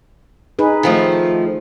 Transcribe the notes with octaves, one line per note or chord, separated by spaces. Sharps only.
D#4 G#4 B4
D#3 F3 A3